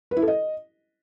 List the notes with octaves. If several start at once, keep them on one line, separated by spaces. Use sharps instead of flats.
B4
E4
A4
D#5